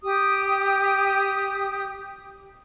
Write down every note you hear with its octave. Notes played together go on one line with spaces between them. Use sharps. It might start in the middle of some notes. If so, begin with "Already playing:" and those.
G4 D#6